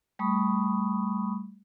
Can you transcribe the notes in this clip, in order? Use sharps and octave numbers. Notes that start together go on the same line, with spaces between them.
G3 A3 B5 C#6 D#6